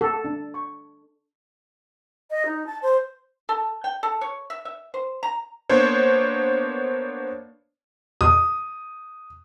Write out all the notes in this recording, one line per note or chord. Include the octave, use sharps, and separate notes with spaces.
A4
D4
C#6
D#5
D#4
A5
C5
A4
G5
A4
C#5
E5
E5
C5
A#5
A#3 B3 D4 C5 C#5
D#6